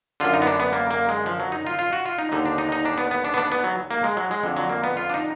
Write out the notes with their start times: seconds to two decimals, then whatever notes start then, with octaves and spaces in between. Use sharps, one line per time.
0.20 F#2 D3 F4
0.34 D#4
0.42 B3
0.47 D4
0.60 B3
0.73 A#3
0.91 A#3
1.09 G#3
1.26 F3
1.40 F#3
1.52 D#4
1.67 F4
1.79 F4
1.93 F#4
2.06 F4
2.19 D#4
2.32 D#2 D3 D#4
2.46 D4
2.58 D#4
2.72 D#4
2.85 D4
2.98 B3
3.11 B3
3.25 D4
3.34 B3
3.38 D4
3.52 B3
3.64 F#3
3.91 A#3
4.04 G#3
4.17 F#3
4.31 G#3
4.43 F2 D3
4.57 F#3
4.70 A#3
4.84 B3
4.97 F4
5.10 D4
5.14 D#4